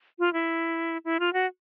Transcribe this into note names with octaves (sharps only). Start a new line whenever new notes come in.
F4
E4
E4
F4
F#4